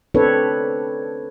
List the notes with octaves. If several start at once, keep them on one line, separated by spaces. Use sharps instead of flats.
C4 D4 A4 B4 C#5